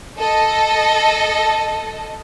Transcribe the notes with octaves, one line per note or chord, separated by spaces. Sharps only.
A4 D#5